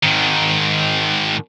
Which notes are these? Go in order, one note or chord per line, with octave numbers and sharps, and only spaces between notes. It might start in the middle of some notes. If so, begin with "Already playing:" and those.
G#2 D#3